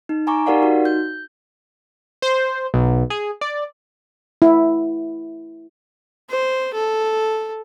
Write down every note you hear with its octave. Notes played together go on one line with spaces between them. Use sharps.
D#4
G#5 A#5 C#6 D6
D#4 G4 A#4 D5 F5 F#5
D#4 F#4
G6
C5
B1
G#4
D5
E4
C5
A4